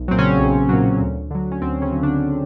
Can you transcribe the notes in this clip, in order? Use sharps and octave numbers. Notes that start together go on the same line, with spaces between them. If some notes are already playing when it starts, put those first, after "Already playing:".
Already playing: B1
A#2 F#3 C4
C#3 C#4
B1
A#2 F#3
D2
D3 F#3
C#4
D2 C4
C#3 C#4
D3 F#3
D3 D4